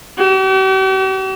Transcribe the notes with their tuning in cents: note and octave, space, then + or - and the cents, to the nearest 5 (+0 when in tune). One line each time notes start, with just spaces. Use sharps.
G4 -45